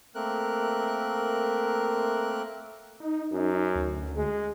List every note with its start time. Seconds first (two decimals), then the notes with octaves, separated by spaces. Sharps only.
0.15 A3 A#3 C4 A#4 F#6
3.00 D#4
3.32 F#2 D#4
3.75 D2
4.16 G#3